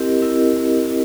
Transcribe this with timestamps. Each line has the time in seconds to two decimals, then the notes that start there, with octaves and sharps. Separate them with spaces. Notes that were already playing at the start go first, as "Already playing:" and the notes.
Already playing: C4 E4 G4 A#4 D#5
0.22 C4 E4 G4 A#4 D#5